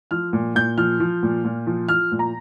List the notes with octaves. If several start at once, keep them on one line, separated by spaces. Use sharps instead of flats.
F3 F6
A#2
A#2 G6
F3 F6
F3
A#2
A#2
F3
F3 F6
A#2
A#5